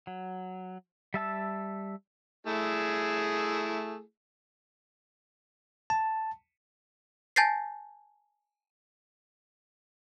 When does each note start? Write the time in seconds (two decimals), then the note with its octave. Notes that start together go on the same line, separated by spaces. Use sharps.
0.07 F#3
1.14 G3 E5 A5 E6
2.47 A3 E4 G#4
5.90 A5
7.36 G#5 A5 G6 A6 A#6 C7